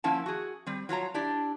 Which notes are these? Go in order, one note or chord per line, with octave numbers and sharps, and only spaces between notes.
F3 A#3 C#4 E4 F#5 A5
F#4 G#4
G3 C4
F#3 F4 C#5 A#5
D4 E4 G4 D5